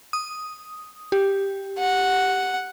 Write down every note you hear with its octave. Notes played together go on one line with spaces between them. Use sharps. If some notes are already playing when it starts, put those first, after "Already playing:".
D#6
G4
F#5